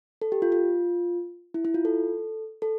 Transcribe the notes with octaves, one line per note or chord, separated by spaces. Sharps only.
A4
G4
F4
F4
E4
E4
F4
A4
A4